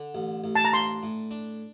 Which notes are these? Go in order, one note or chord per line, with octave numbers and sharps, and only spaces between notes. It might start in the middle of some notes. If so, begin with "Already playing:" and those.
Already playing: D3
A1
A1
A5
A#5
D4 C6
A2
D4